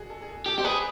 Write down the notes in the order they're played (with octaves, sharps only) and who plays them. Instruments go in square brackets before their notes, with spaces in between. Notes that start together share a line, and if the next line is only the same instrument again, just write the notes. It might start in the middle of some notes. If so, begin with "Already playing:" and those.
Already playing: [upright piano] F#4 G#4
A4
G#4
A4
[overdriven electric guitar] G4 [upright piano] A4
[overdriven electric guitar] G4 [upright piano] C5
[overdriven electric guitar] G#4 [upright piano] B4